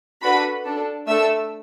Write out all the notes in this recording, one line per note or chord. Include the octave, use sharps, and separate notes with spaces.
D4 F#4 A4 B4 B5
D4 A4
A3 D4 A4 E5 E6